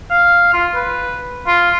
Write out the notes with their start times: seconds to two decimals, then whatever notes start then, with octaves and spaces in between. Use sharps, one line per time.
0.11 F5
0.53 F4
0.75 B4
1.47 F4